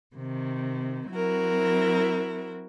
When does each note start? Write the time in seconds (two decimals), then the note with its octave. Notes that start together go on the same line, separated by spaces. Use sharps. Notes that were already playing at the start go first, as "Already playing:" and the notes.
0.16 C3 D#3
1.09 F#3 C4 E4 F#4 A#4